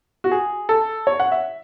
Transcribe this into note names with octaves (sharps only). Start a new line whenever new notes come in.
F#4
G#4
A4
C#5
F#5
E5